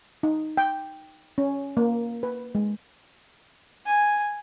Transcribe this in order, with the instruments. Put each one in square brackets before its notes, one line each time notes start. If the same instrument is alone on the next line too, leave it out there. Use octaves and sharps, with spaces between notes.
[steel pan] D#4
G5
C#4
A#3
B4
G#3
[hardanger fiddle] G#5